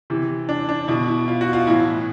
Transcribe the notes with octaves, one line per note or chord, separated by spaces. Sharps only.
C3 E3
D4
D4
B2 E4
E4
F4
F#4
F4
A2 E3 E4